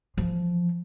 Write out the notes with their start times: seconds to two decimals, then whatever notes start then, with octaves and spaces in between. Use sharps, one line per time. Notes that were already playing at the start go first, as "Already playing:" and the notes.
0.17 E3 F3